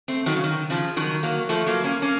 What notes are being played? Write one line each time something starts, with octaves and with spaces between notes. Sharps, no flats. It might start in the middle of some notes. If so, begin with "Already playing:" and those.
A3 C4
D#3 F#3
C#3
D#3
C#3 F3
D#3 F#3
F#3 A#3
F3 A3
F#3 A#3
A#3 C#4
A#3 C#4